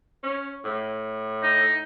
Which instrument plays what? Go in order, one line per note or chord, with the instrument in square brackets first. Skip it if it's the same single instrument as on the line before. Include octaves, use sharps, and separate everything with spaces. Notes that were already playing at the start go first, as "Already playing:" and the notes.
[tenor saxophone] C#4
A2
[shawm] D#4